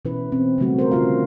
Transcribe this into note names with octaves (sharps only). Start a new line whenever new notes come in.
B2 E3 C#4 E4 B4
C4
C#3 F#3 G3 A3 C4 F#4
A#4 C5
C#3 C#4 F4 F5
D3